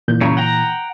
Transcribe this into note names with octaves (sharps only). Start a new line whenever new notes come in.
A#2 E3 G6
C#3 F#3
F#5 G5 A#5